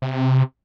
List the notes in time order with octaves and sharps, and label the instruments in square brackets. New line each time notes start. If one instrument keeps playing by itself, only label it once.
[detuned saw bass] C3